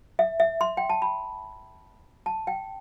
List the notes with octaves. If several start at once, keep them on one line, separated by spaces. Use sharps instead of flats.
E5
E5
C6
G5
A5
B5
A5
G5